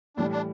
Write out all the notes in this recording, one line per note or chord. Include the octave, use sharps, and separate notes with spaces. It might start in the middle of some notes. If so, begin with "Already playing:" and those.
A2 E3 G3 D4
D4